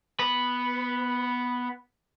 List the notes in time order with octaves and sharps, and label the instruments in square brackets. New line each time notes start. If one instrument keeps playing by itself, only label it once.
[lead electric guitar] B3 B4